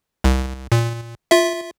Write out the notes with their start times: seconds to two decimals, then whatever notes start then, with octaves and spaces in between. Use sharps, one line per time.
0.24 C2
0.72 A#2
1.31 F4 E5